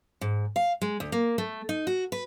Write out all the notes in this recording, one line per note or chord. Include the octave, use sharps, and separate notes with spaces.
G#2
F5
G#3
D2
A#3
A3
D#4
F#4
B4